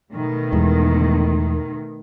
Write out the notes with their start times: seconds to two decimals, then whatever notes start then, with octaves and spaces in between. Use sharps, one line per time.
0.13 B2 D#3 A3
0.52 E2 G#3